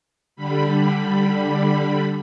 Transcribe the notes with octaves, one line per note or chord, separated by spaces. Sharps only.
D3 G3 B5